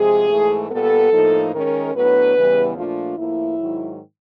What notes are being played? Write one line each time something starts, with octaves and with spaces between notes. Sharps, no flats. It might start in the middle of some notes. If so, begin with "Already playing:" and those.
Already playing: C3 F3 G#3 G#4
G#2 E3 A3
A#2 G3 B3 A4
A2 F3 A#3 D#4
D#3 G#3 C#4 A#4
A2 F#3 B3 D4 B4
E2 C#3 E3 G3 B3
A#2 F3 A3 D4 F4
A2 F3 A#3 E4
G#2 D#3 F#3